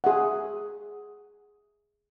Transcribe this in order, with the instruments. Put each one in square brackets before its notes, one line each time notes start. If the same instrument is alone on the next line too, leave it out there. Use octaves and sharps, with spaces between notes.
[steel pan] G#4 E5 F#5